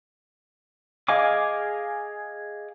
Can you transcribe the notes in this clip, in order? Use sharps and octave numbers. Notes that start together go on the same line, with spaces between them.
G#4 D#5 F5 G#5 D6